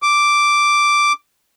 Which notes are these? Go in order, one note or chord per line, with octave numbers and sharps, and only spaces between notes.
D6